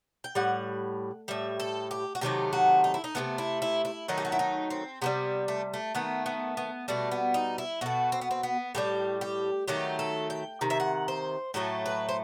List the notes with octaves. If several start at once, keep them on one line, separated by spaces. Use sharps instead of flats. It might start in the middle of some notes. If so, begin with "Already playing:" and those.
G5
A2 G3 F#5
A2 G3 E5
A4
G4
F#4
C3 D#3 F#3 A3 G4
F#4
D#4
E4
D#4
C3 E3 A3 B3
E4
E4
E4
D#3 F#3 A3 D#4
G4
F#4
E4
D#4
C4
C3 E3 G3 B3
A3
A3
D#3 A3 B3
B3
B3
B2 G3 A3
B3
D#4
E4
B2 A3 F#4
C4
B3
C4
B3
A2 E3 G3 G4
G4
D#3 F#3 A3 G4
A4
G5
C3 D#3
E5
F#5
C5
A2 F#3 A3 A4
B4
C5